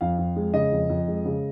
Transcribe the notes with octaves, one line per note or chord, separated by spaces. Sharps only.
F2 F5
F2
G#3
C#3 D#5
F2
F2
G#3
C#3